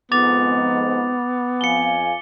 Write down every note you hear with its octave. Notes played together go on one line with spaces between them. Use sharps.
F2 G#2 B3 D6 A6 F7
F2 F5 G#5 C#7 G7